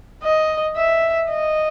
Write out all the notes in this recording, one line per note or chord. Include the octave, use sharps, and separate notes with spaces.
D#5
E5
D#5